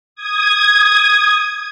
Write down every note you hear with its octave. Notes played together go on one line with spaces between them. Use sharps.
D#6 G#6